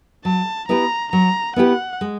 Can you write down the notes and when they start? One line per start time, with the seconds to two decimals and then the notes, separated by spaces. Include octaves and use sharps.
0.25 F#3 A5
0.68 B3 E4 G4 B4 A#5
1.12 F#3 A#5
1.56 B3 E4 G4 B4 F#5
2.01 G#3